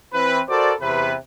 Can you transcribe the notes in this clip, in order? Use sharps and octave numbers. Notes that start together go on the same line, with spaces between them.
E3 C4 B4
F#4 A4 A#4 C5 D5
E2 C3 B4